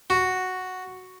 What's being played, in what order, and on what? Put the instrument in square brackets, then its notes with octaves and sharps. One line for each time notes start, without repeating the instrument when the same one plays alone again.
[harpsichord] F#4